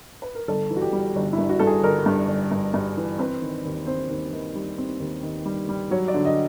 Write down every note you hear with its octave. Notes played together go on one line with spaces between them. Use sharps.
B4
A#4
G1 A4
E3
F#4
G4
G3
G1
E4
G2
F#4
G2 A4
G#4
G1 A#4
G2
G1
G2
G2
E3
C4 B4
D#3
D#2
C4 C5
D#2
D#3
G3
C4
D#2
D#3
G3
G3
F#3 C#5
D5
D3
D#5